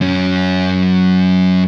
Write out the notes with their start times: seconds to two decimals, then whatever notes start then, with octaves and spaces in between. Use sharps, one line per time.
0.01 F#2 C#4